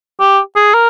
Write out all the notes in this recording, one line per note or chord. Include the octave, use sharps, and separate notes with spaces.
G4
G#4
A#4